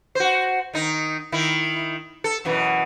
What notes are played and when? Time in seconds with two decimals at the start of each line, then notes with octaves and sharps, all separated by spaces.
0.15 F#4 C5
0.74 D#3 D#4
1.32 D#3 E4
2.24 A4
2.45 F#2 B2 E3